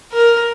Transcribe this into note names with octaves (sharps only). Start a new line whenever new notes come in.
A#4